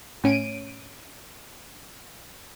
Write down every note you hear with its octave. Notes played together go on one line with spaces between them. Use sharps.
A2 C#4 D7 D#7